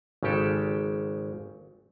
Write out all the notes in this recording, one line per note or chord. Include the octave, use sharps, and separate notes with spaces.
G#1 C#3 G#3 G4 A4